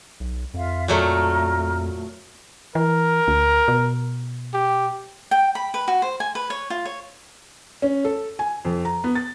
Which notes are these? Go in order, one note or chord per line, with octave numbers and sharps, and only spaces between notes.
B1
F2 F4 E5 F5
A#2 F#3 A3 A#5 F6
E3 A#4
D2
B2
G4
G5
B5
B4
F#4
C5
G#5
B4
C#5
F4
C#5
C#4
A4
G#5
F2
A#5
B3
A6